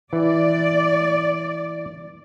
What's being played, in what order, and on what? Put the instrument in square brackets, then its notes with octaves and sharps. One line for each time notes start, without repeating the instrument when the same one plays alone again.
[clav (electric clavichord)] E3 [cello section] D5